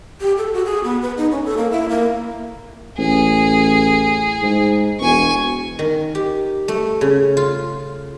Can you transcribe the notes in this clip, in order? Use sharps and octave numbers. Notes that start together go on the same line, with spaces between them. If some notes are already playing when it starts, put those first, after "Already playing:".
G4
A4
F#4
G#4
B3
B4
D#4
C#4
A4
A#3
E4
A#3
A1 G#4
G#2
E1 G#5 C#6
D#3
G4
A3
C#3
F4